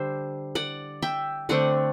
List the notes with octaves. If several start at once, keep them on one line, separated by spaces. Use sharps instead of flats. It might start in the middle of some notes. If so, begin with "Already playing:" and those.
Already playing: D3 G3 D4 C5 E5
D5 F#5
E5 G5
D3 A3 C4 D5 F#5